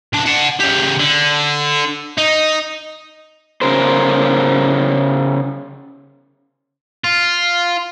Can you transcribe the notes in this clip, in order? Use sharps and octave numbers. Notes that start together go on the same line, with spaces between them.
C#2 D4
F#5 A5
C#3 G4
D3
D#4
C#3 A#4 C5
F4